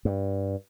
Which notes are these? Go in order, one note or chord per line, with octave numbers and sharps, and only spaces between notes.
G2